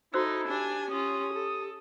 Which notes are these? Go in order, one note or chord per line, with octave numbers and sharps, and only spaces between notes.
D#4 E4 F#4 A4 C5 E6
D4 G4 G#5
C#4 F4 D#6
A4